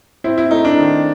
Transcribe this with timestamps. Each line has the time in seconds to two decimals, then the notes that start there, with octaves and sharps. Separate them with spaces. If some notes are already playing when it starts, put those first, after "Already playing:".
0.24 C4 E4
0.38 E4
0.51 A3 D#4
0.65 D4
0.77 D#3